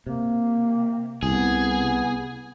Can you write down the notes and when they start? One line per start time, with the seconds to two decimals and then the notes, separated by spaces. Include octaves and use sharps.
0.07 C3 A#3
1.23 C2 B3 G#4